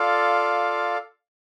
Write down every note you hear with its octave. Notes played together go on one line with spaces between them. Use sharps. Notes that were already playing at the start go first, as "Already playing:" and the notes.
Already playing: F4 A4 D5 F5